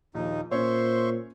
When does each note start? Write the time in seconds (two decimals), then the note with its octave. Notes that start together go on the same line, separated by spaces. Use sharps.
0.14 A#1 D#2 D#4
0.51 A#2 C#4 C5 C#5 E5 C6 C#6